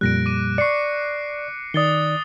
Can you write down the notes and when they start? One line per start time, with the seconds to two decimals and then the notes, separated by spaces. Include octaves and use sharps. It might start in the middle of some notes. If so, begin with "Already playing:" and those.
0.01 F2 A#2 G3 F#6 A#6 D7
0.26 D6 D#7
0.58 D5 C#6 C7 C#7
1.74 D#3 D5 D#6 A6 G7